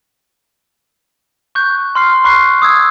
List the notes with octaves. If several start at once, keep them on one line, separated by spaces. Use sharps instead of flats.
C#6 F#6 G6
C6 F6 C7
B5 C#6 F#6 C7
D#6 E6 G#6